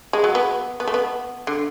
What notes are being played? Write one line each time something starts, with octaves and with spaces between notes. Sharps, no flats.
G#3
F#3
B3
B3
A3
B3
D3